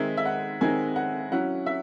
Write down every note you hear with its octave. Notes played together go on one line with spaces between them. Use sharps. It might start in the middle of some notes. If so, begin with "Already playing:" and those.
Already playing: D#3 G#3 C4 D#4 E5
E5
F#5
D#3 G#3 C4 D#4 G#5
F#5
F#3 C#4 E4 F#5
E5